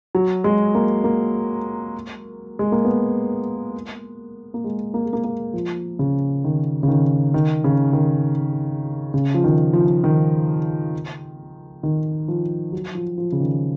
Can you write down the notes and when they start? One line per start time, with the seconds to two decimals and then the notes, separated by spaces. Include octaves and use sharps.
0.15 F#3
0.44 G#3
0.75 A#3
1.04 A#3
2.59 G#3
2.72 A#3
2.85 B3
4.54 A#3
4.64 G#3
4.94 A#3
5.04 G#3
5.13 A#3
5.24 A#3
5.53 F3
5.99 C#3
6.44 D#3
6.83 C#3
6.88 D#3
7.34 D#3
7.64 C#3
7.93 D#3
9.14 C#3
9.34 F3
9.44 D#3
9.73 F3
10.04 D#3
11.83 D#3
12.28 F3
12.73 F#3
12.95 F3
13.18 F3
13.32 C#3
13.40 D#3